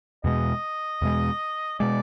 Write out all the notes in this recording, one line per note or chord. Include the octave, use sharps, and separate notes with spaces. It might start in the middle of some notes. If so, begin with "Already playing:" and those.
E2 B2 G#3 D#5
E2 B2 G#3
B2 G#3 D5